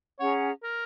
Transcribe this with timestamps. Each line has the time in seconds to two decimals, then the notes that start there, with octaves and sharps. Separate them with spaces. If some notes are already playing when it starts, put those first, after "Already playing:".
0.19 C#4 G#4 C#5 F#5 A#5
0.63 A#4